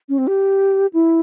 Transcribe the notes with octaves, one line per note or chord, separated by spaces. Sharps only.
C#4
C4
G4
E4